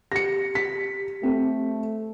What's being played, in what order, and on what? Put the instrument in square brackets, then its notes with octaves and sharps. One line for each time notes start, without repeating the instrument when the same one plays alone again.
[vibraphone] G4 [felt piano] A#6 C#7
[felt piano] B6
[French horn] A3 [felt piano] C4